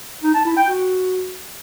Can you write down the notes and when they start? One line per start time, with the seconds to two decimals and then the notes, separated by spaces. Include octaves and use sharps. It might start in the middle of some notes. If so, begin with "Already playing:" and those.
0.23 D#4
0.34 A5
0.45 E4
0.57 G5
0.68 F#4